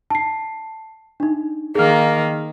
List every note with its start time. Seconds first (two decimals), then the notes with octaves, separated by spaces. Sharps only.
0.10 A5 C7
1.20 D4 D#4
1.75 D#3 A#3 G#4 F6